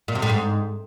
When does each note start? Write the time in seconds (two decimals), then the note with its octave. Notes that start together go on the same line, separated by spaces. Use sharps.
0.08 A#2
0.15 C3
0.22 A2
0.29 G#2